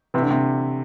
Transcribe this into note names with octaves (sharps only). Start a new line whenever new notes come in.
C3 E3
D3
C3